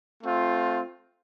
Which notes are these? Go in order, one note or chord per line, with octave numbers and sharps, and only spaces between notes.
A3 C4 F4